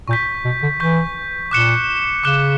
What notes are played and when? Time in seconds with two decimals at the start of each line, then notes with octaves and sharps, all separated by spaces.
0.08 A#2 C#6
0.11 G6 B6
0.45 B2
0.62 D3
0.79 E3 C#6 G6 B6
1.51 A#2 D6 F#6 C#7 E7 G7
2.24 C#3 D6 F#6 C#7 E7 G7